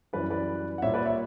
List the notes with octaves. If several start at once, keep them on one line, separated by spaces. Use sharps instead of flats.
F#2 E3 G3 B4 D5
B4 D5
F#5
A#2 G3 C#5 E5
B4 D5
C#5 E5